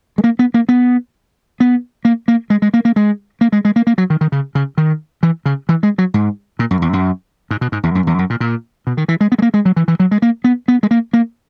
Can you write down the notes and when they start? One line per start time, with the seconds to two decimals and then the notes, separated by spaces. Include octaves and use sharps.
0.18 G#3
0.24 A#3
0.39 B3
0.54 A#3
0.69 B3
1.60 B3
2.05 A#3
2.28 A#3
2.50 G#3
2.62 G#3
2.74 A#3
2.85 A#3
2.96 G#3
3.41 A#3
3.52 G#3
3.65 G#3
3.76 A#3
3.87 A#3
3.98 F#3
4.10 D#3
4.21 D#3
4.32 C#3
4.55 C#3
4.78 D#3
5.23 E3
5.46 C#3
5.69 E3
5.83 G#3
5.98 F#3
6.14 G#2
6.59 A#2
6.71 F#2
6.82 E2
6.93 F#2
7.51 G#2
7.61 B2
7.72 G#2
7.83 E2
7.95 F#2
8.07 E2
8.19 F#2
8.30 A#2
8.40 A#2
8.87 B2
8.97 D#3
9.08 E3
9.21 G#3
9.32 B3
9.38 G#3
9.42 A#3
9.54 G#3
9.65 F#3
9.76 E3
9.88 E3
10.00 F#3
10.11 G#3
10.22 A#3
10.44 B3
10.68 B3
10.83 G#3
10.91 A#3
11.13 A#3